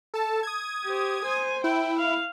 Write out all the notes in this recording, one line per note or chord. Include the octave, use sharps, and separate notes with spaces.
A4 A5
D#6 G#6
G4 C5
C5 G#5
E4 G5
F5